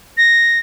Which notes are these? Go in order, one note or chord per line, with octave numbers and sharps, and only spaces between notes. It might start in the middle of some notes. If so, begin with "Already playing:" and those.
A#6